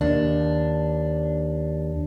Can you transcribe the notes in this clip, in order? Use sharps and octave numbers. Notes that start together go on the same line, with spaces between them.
D#2 D4